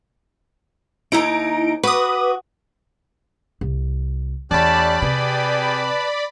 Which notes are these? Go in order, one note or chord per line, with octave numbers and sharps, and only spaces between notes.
D#2 D#4 E4 A#5 D7
F#4 B4 D6 D#6
C2
E2 A3 C#4 G4 D5 A5 B5 F#6
C3 G4 G#4 B4 G5 A5